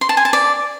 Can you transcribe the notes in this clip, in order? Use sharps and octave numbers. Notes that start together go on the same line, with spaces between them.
C6
A5
G#5
A5
D5